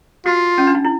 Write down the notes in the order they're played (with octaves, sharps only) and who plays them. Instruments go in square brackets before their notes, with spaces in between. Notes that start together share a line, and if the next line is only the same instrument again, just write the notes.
[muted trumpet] F4 [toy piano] F#4
[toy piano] C#4
D4
D#4
E4